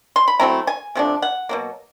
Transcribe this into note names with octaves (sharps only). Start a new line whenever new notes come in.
C6
B5
F#3 A3 C4 E4 A#5
G#5
C3 F3 A3 D4
F#5
B2 F#3 A#3